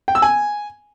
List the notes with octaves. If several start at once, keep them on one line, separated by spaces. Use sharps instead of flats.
G5
E6
G#5